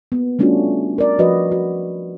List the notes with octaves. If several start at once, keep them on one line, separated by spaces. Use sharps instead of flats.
A#3 B3
G3 A3 C#4 D4 F4 F#4
A#4 D5
F3 F#4 B4 D5 D#5
F#4